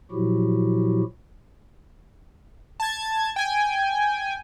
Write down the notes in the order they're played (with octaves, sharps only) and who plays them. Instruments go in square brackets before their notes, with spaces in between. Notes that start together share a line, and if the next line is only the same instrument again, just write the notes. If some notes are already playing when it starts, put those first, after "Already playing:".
[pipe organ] A#2 F3 F#3 E4 F#4 G4
[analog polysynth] A5 G#6
G5 G#5